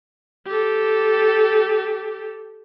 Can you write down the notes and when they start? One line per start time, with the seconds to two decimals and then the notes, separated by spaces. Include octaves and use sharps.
0.47 G4 A4